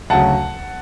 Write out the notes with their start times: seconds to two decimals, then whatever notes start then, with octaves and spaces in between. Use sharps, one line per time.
0.10 D2 C#3 F#3 F#5 A5